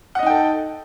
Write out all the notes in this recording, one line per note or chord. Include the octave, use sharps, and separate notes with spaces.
D#4 A4 D#5 F#5 G5